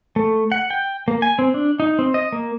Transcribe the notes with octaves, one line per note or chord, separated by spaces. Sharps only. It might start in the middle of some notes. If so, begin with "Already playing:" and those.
A3
F#5
G5
A#3
G#5
C4
D4
D#4
C4
D#5
A#3